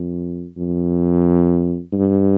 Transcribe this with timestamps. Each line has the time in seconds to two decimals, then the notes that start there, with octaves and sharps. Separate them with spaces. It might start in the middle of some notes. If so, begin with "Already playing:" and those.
Already playing: F2
0.57 F2
1.93 G2